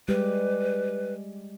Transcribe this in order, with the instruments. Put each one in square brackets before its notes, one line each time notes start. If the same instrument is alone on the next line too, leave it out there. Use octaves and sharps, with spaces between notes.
[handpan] G3 G#3 G4 [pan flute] B4